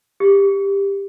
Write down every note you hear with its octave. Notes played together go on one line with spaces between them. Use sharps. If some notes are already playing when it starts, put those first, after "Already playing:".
G4